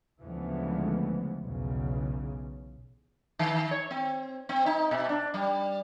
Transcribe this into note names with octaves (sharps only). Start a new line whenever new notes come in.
D2 C#3 E3 F3 G#3 B3
B1 E2 C#3
D#3
C#5
C4
C4
D#4
B2
D4
G3